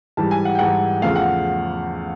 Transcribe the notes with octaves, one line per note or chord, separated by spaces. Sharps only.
G#2 E3 G3 A5
G#5
F#5
G5
G#2 E3 G3 F#5
E2 C#3 F3 A3 F5
F#5